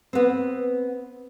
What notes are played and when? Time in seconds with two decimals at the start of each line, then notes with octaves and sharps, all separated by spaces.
0.13 B3 C4